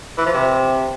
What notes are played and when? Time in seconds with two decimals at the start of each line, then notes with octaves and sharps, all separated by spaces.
0.18 E3
0.26 F3
0.34 C3